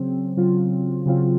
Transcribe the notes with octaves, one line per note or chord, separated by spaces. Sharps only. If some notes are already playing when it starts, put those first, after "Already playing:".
Already playing: C#3 F#3 C4
C#3 F#3 C4 F4
C#3 F#3 C4 F4